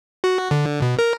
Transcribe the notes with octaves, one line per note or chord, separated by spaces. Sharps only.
F#4
D3
B2
A#4